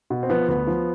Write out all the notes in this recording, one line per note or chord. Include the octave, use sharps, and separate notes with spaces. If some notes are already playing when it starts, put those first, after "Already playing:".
B2
C4
F3 B3
D2 B3
F3